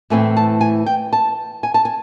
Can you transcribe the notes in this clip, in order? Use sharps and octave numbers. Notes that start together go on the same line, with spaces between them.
A2 E3 A3 C4 G#5
A5
G#5
G5
A5
G#5
A5
G#5